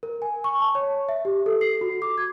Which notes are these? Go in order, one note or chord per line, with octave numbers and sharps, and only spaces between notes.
A#4
G#5
C#6
A5
C#5
E5
G4
A4
C7
F#4
D6
G#6